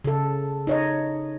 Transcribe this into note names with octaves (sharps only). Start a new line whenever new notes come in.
C#3 A4
D#4 C#5 D#5